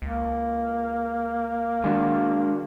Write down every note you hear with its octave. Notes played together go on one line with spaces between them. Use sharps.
C#2 A#3
D#3 G#3 D4 F#4